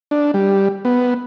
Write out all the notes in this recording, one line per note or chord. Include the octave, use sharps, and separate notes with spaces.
D4
G3
B3